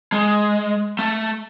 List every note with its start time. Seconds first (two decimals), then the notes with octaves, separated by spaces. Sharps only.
0.12 G#3
0.99 A3